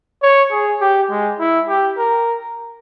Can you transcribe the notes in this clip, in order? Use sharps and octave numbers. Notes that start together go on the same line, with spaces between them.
C#5
G#4
G4
G#3
E4
G4
A#4